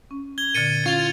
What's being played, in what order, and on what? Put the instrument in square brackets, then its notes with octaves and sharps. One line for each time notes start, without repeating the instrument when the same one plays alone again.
[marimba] C#4
[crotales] G#6 G7
[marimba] A#2 D3 [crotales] A6 C#7 D#7
[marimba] C#4 E4 [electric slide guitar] F4 [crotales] G#6 A6 F7